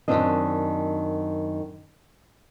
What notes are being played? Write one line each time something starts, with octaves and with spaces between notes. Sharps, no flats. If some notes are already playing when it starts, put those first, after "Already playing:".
F#2 C3 D#3 C4 D4 D#5